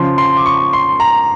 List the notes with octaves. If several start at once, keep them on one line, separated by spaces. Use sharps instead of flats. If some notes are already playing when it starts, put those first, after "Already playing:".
Already playing: C#3 F3 C6
C6
D6
C#6
C6
A#5